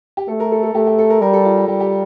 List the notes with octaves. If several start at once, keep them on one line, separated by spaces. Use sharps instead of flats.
G4
A3 A4
A#4
A4
A4
A3 G4
G4
A4
A#4
G3 A#4
A4
F4
G4
G3 G4
G4